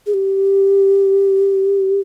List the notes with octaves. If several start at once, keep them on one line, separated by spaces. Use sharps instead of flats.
G#4
G4